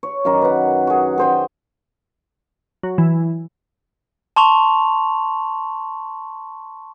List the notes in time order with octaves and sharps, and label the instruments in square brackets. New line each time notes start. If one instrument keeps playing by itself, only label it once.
[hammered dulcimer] C#5
F#2 D#3 A#4 D6
B4 F#5
F#4 G#4
G#4 C5 G5
[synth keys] F#3
E3
[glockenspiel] A5 C6 C#6 F7